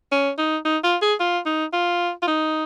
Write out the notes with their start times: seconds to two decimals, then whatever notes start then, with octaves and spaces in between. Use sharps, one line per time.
0.12 C#4
0.38 D#4
0.65 D#4
0.84 F4
1.02 G#4
1.20 F4
1.46 D#4
1.73 F4
2.22 F4
2.28 D#4